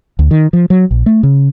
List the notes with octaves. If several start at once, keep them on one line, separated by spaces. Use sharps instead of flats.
D2
D#3
F3
F#3
A#1
A3
C#3